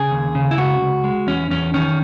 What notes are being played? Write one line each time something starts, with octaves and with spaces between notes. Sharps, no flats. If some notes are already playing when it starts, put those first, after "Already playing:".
Already playing: C#3 G#4
D#2
C#3
E4
C#2 F#4
C#2
G#3
E2 C#4
E2 C#4
D#3 C#4